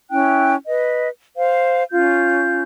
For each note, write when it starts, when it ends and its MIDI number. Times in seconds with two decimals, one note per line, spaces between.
0.10 0.55 61
0.10 0.55 64
0.10 0.55 79
0.10 0.55 90
0.67 1.08 71
0.67 1.08 75
1.35 1.82 72
1.35 1.82 77
1.91 2.63 61
1.91 2.63 65
1.91 2.63 91